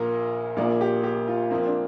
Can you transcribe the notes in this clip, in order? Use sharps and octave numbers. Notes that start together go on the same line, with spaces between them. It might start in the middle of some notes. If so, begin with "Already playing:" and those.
Already playing: A#1 A#2 A#3 A#4
A#1 A#2 A#3 D5
G4
G4
F4
F2 F3 A#3 C4
D4